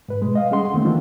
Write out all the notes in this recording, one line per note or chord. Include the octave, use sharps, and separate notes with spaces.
G#2 B4
B2 G#3
D#5 F5
G3 C#4 G#4 F#5 C6
D2 D#3 A3 A#3 C4
E3 A#3 C4 D4 F4